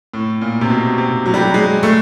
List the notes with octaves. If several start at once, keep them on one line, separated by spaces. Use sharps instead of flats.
A2
A#2
C3
B2
C3
F#3
G3
F#3
G#3
A3